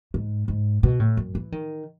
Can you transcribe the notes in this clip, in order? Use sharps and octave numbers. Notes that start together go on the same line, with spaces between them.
G#2
G#2
B2
A2
F#2
E3
D#3